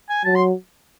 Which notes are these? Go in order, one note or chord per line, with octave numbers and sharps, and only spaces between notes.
G#5
F#3 A5
C6